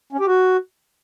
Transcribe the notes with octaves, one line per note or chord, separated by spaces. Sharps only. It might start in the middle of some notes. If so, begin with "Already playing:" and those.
C#4
G4
F#4